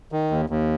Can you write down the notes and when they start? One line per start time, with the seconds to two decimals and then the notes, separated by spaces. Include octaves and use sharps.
0.12 D#3
0.31 D#2
0.50 D#2